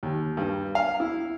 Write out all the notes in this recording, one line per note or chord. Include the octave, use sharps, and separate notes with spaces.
D#2
G2
F5
E4